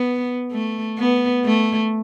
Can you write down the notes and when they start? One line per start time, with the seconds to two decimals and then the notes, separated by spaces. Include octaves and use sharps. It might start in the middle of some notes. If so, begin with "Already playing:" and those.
Already playing: B3
0.52 A3
0.99 B3
1.45 A3